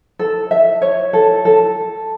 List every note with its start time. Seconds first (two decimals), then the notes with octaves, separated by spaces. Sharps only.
0.19 A4
0.51 E5
0.82 C#5
1.13 A4
1.45 A4